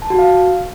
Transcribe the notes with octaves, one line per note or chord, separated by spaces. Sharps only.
A5
F#4
F5